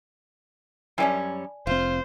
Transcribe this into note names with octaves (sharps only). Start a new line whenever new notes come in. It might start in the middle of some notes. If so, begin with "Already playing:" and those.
F#2 G3 C#4 D5 G#5 A5
F1 C4 F4 C5